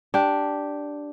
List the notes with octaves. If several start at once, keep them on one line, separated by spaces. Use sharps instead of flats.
D4 G4